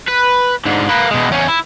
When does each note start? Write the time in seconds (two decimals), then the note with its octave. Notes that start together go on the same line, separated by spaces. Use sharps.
0.08 B4
0.66 G#2 D3
0.89 A#3 B4
1.11 B2 G#3
1.31 E2 C#4
1.48 E4